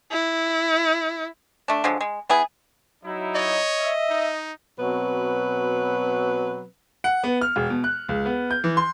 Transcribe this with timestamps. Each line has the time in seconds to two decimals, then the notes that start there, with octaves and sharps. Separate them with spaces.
0.12 E4
1.68 A3 D4
1.84 D3 F3 F#3 G#3
2.00 G#3
2.29 B3 E4 G#4
3.04 F#3 D#4 E4
3.35 C#5 D#5
3.80 E5
4.10 D#4
4.78 B2 F#3 C4 B4
7.04 F#5
7.24 B3
7.41 F6
7.56 E1
7.70 B2
7.84 F#6
8.09 C#2
8.25 B3
8.51 G6
8.64 E3
8.77 C6